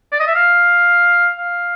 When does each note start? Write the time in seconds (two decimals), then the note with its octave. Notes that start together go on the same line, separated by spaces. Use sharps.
0.12 D5
0.20 D#5
0.27 E5
0.35 F5
1.39 F5